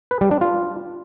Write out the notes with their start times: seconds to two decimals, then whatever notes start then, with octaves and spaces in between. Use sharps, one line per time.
0.11 B4
0.21 G3
0.31 D4
0.41 F4